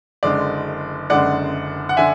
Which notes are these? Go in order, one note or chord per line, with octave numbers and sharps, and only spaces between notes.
F#1 F#2 D3 G#3 D5
F#1 F#2 D3 G#3 D5 F#5
F#5
D3 E5 G#5